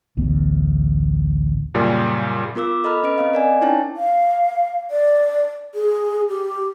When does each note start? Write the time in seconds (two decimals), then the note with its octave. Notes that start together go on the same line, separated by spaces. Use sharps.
0.17 A1 D2 A3 B3
1.74 F#2 A#2 C#3 G3
2.55 B3 F4 A#4 D6 E6
2.84 A4 D#5 A#5 B5 F6
3.03 C#4 B4 D#5 D7
3.18 C4 D#5 F5
3.33 A#4 D5 G#5
3.61 C#4 D#4 E4 C#5 G5 A5
3.97 F5
4.91 D5
5.75 G#4
6.29 G4